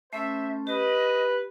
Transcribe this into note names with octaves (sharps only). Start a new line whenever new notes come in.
A3 C#4 A4 C5 E5
G4 B4 D#5